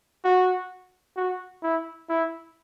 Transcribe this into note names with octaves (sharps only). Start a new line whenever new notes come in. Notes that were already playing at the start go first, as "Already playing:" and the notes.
F#4
F#4
E4
E4